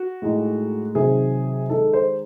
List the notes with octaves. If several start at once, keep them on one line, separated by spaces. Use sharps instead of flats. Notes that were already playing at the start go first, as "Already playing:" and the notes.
Already playing: F#4
A2 G#3 D#4
C3 D#3 F#3 C4 D#4 G#4
D#3 G#3 D#4 A4
C5